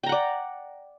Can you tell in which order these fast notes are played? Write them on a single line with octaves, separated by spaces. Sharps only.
G5 A#5 F#5 D5